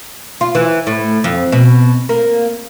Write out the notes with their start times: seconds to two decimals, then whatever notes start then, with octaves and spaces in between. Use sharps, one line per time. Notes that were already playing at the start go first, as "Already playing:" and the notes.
0.41 F4
0.55 E3
0.87 A2
1.24 F2
1.52 B2
2.09 A#3